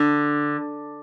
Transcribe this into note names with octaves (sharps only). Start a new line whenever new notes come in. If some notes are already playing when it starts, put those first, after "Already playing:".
Already playing: D3